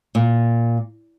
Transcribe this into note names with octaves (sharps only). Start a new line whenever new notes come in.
A#2